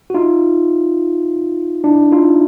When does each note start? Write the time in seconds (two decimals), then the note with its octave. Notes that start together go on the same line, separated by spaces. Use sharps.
0.10 F#4
0.14 D#4 F4
1.84 D4 E4
2.12 D#4 F4